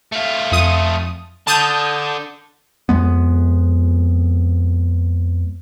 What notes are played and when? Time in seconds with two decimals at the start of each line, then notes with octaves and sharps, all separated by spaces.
0.12 A3 F4
0.52 F2 D#6
1.47 D3 A5 D#6 G6
2.89 F2 G#3 B3